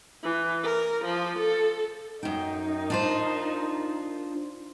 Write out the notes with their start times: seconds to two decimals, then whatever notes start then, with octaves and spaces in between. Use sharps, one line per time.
0.23 E3
0.64 A#4
1.05 F3
1.39 A4
2.23 F#2 D#4 A#4 G5
2.90 D4 F4 C5